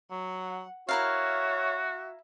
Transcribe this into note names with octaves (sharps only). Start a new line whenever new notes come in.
F#3 F#5
E4 F#4 A#4 C#5 E5 F5